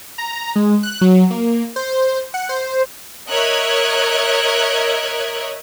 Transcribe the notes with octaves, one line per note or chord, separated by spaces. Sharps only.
A#5
G#3
F#6
F#3
A#3
C5
F#5
C5
A#4 C#5 D#5 E5 F#6 G#6